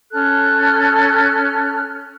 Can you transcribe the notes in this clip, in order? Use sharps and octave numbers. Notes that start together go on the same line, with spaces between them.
C#4 A4 F6 F#6